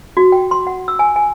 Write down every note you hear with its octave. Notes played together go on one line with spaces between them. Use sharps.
F#4
G5
C6
F#5
E6
G#5
G#5